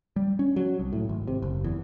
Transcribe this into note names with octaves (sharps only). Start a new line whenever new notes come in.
G3
C#4
F#3
C2
A2
G#1
C3
F#1
E2